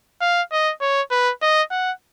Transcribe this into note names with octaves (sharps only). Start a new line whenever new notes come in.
F5
D#5
C#5
B4
D#5
F#5